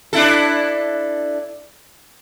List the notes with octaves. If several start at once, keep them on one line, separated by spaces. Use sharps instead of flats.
D4 E4 A4